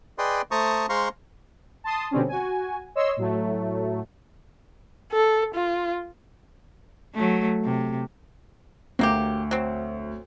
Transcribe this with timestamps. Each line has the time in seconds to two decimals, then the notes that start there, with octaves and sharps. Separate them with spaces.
0.18 G#4 B4 D5 D#5 G5 C6
0.51 A3 C5 A5 A#5 C#6 D#6
0.89 G#3 C5 F5 A#5 C6 C#6
1.84 A5 C6 D#6
2.11 B2 D3 G3 C4 C#4
2.28 F#4 G#5
2.95 C#5 D#5 C6 E6
3.17 A2 F#3 A3
5.12 A4
5.55 F4
7.14 F#3 A3
7.65 C3
8.99 D2 F#3 A#3 G4
9.51 F#3 C4